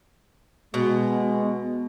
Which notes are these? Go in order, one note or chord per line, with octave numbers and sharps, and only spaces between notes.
B2 G#3 B3